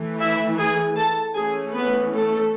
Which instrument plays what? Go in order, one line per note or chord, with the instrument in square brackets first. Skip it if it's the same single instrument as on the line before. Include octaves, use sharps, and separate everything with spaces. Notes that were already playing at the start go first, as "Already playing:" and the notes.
Already playing: [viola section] E3 A3
E4 E5
G#4 G#5
A4 A5
E3 A3 C#4 G#4 G#5
B3 B4
A3 A4